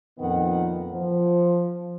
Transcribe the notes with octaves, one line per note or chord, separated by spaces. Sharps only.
F2 A#2 D#3 B3 F#5
F3